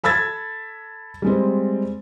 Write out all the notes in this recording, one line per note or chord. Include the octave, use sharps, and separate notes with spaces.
A4 B5 E6 G#6 A6
G3 G#3 C4